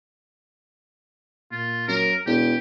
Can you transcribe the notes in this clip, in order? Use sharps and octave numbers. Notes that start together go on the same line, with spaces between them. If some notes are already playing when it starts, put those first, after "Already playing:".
A#2 F4
F#2 A#4
E1 E2 G4